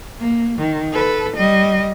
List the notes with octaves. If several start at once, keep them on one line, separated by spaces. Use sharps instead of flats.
A#3
D#3
A4 B4
G3 D#5